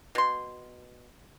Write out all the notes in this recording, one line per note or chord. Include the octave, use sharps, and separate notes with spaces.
B2 C6